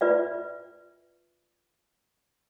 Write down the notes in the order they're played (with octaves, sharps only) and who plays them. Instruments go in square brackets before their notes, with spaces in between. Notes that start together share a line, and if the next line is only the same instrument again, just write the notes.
[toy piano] F4 B4 D5 E5